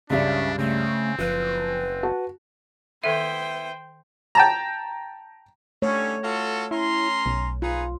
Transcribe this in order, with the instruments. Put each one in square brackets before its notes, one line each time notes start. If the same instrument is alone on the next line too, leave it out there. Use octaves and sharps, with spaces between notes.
[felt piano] C#2 G2 D5 [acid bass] C#3 [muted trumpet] D4 [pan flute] E5
[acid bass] C#3 [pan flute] A3 [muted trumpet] C4
[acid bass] F#1 [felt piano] F3 [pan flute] B4
[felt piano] F#4 A5
[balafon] D#3 A4 E5 [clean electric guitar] B3 E4 B4 [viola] C5 G5
[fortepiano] G5 A5 A#5
[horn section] D3 G3 C#4 [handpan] A3 C#5
[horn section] F4 F#4 A4
[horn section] C#4 A#5 C6 [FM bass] E4
[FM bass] B1
[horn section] D#4 G#4 B4 [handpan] F4